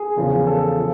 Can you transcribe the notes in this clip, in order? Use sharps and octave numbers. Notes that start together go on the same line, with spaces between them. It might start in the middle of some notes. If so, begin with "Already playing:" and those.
Already playing: G#4
E2 C#3 F3
A4
F3